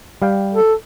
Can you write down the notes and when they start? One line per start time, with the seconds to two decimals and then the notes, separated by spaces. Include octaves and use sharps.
0.22 G3 F5 G5
0.55 A4